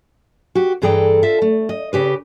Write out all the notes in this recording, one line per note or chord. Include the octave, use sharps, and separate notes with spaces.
F#4 G4
G2 E3 G#4 A4 G5 A#5
F4 A4 E5
A3
D#5
C#3 G4 B4